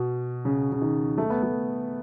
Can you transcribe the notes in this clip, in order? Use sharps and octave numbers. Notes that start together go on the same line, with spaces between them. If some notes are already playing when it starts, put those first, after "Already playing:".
Already playing: B2
C#3
C#3
D#3
A3
B3
A3